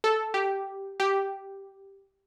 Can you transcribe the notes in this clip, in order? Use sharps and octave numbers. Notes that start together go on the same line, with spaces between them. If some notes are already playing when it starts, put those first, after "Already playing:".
A4
G4
G4